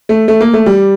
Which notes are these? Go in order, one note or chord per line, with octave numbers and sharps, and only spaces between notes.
A3
A3
A#3
A3
G3